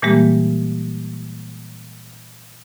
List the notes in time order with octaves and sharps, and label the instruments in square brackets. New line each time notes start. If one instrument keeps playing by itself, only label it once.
[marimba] A#2 E3 G3 G#3 A#3 G4